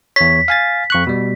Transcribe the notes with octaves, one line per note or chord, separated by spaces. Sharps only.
E2 C#5 B6
F5 G#5 A6
F2 C#6 F#6
B2 G3